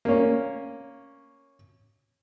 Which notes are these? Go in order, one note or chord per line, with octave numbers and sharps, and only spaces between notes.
A#3 C#4